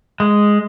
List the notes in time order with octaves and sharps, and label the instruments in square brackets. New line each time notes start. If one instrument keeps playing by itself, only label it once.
[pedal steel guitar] G#3